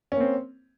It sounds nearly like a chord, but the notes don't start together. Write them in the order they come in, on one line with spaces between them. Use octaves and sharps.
C#4 A#3 C4